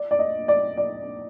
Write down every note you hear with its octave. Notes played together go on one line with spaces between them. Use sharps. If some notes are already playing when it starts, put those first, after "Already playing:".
Already playing: D5
D5
D#5
D5
D5